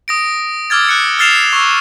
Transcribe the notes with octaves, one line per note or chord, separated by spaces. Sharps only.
D#6 A#6 D7
D6 E6 F6 G#6 A6
F#6 C#7
E6 F6 A6 C7 E7 F7
C#6 E6